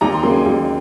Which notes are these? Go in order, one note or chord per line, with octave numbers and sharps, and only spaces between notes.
D#2 A#5
C6
C#3 F#3 A#3 C6
G#5
D#2